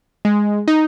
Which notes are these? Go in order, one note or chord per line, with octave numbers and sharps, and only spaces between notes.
G#3
D#4